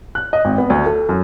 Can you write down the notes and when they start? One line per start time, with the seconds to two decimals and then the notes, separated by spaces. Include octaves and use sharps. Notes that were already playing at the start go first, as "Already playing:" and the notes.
0.15 F#6
0.33 D#5
0.45 G#1
0.58 B3
0.70 D2
0.86 A4
1.09 F#2